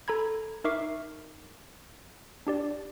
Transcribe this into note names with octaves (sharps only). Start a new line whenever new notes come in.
A4 A#5 B5 G#6
D#4 A#4 E5 C#6 D6 C7
D4 G4 D5